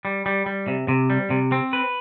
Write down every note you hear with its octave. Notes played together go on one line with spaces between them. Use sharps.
G3
G3
G3
C3
C3
G3
C3
C4
B4